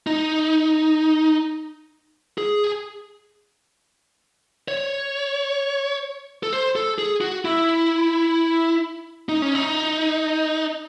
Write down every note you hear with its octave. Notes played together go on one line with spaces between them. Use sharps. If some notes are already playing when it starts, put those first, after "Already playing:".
D#4
G#4
C#5
A4
C5
A4
G#4
F#4
E4
D#4
C#4
D#4